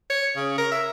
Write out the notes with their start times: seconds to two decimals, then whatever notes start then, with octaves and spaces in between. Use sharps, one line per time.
0.10 C#5
0.36 C#3
0.58 A#4
0.72 E5